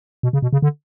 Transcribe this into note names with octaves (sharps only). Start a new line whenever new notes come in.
B2
C#3
B2
C#3
D3